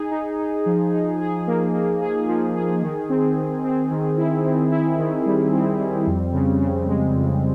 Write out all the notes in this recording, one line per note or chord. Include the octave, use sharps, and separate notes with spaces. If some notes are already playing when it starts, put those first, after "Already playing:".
Already playing: D#4 G#4
D#4
D#4
F3
D#4
G#4
A#3
A#3
G#4
F3
G#4
D#3
C4
D#3
C4
D#3
E4
C4
E4
D#3
G3
C4
G3
F2
C#3
C#3
G#3
F2